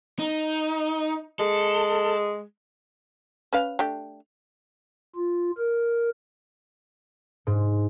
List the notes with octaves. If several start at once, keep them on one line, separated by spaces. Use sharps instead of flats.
D#4
G#3 A4
C#4 B4 F5
A3 D4 G4
F4
A#4
G#2